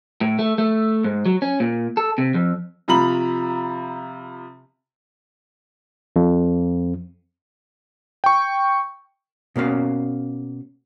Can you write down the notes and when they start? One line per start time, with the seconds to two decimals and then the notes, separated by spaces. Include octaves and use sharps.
0.21 A2
0.39 A3
0.58 A3
1.04 G#2
1.26 F#3
1.42 C#4
1.60 A#2
1.97 A4
2.18 C3
2.34 F2
2.88 C3 F3 A#5 B5 F#7
6.16 F2
8.24 G5 C#6
9.56 B2 A#3 C#4 F5